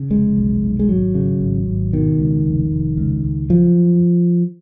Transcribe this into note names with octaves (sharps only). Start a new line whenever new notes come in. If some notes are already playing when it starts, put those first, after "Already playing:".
Already playing: C#3
F1 G#3
B1
B1
G#3
G#1 F#3
C#3
G#1
G#1
B2 D#3
C#2
F1
F1
C#2
C#2
F#2 F3